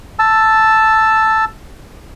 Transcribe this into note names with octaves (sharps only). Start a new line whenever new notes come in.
A5 E6